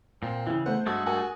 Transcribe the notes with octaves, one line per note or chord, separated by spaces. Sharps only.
A#2 C4
C#3 E3 E4
A3 B3 C5 F#5
G2 G#3 A3 F#4 D#6
F#4 A#4 G#5